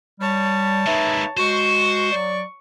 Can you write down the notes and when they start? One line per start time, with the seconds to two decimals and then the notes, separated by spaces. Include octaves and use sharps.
0.20 G3 C#5 A5
0.87 G#3 A#3 D#4 B4 E5
1.37 G#3 F#4 C5 C#6
2.12 F#3 D5